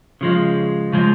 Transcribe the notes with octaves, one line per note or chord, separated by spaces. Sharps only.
C#3 F3 G#3
C#3 F3 G#3